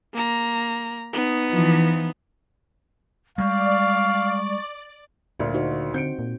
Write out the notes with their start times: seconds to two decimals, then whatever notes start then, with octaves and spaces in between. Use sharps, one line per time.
0.13 A#3 A#5
1.13 B3 D#4
1.51 E3 F3
3.38 G3 G#3 D5 F5 C#6
5.39 D2 A#2 D3
5.54 D#4 F#4 C5
5.94 D3 C4 G6 C#7 D7
6.19 A#2